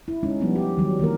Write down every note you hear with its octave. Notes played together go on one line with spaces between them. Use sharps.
E4
G#3 C#4 D#4
F3 G3 B3 D4
G4
D#3 F#3 G3
D#3 E3 A#3 A#4